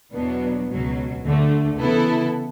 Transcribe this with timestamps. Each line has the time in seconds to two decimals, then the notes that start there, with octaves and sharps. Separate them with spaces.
0.14 E2 B2 F#3 B3 D4
0.69 C#2 B2 F#3
1.24 D2 D3 A3
1.79 C#3 E3 B3 E4 A4